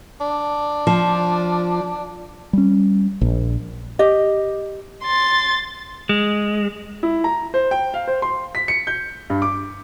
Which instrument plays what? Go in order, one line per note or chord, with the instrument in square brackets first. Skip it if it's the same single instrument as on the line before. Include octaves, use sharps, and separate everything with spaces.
[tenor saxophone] D4
[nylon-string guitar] F3
[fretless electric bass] G3 C#4
A#1
[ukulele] G4 D#5
[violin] C6 A6
[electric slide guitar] G#3
[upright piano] E4
A#5
C5
G5
F5
C5
C6
B6
C#7
G6
G2
D6